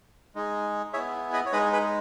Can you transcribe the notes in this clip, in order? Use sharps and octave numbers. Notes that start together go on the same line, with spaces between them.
G#3 D#4 G#4
B3 E4 G#4 C#5 E5
B4 D#5
C#5
G#3 D#4 G#4 B4 D#5
G#4 B4